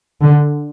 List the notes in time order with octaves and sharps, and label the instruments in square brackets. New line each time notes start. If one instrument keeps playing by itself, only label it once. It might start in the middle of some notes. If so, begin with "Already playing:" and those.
[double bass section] D3